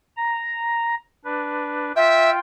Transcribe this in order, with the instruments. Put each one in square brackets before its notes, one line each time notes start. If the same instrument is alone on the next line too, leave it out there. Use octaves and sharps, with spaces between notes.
[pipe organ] A#5
D4 B4
[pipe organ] F4 G5 [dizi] E5